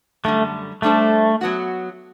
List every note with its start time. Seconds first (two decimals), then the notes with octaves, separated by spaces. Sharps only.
0.24 F#2 D3 G3 A3
0.82 G3 A3 D4 A4 C5
1.41 F#3 B3 F#4